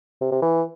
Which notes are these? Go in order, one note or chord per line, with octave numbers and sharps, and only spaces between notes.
C3
C3
E3